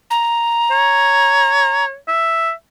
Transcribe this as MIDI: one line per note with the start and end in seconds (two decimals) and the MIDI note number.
0.11 1.85 82
0.71 1.96 73
2.08 2.52 76